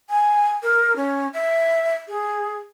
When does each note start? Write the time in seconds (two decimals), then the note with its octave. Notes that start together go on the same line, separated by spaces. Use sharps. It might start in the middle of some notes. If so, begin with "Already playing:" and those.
0.10 G#5
0.63 A#4
0.96 C#4
1.34 E5
2.08 G#4